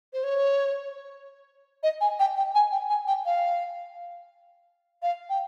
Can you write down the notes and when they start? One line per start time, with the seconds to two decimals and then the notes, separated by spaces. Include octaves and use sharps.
0.13 C5
0.24 C#5
1.83 D#5
2.01 G#5
2.19 G5
2.37 G5
2.55 G#5
2.72 G5
2.90 G#5
3.07 G5
3.26 F5
5.02 F5
5.30 G5